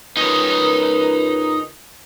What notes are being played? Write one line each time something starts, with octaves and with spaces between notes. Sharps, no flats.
C#2 D#4 A#4 B4 C#5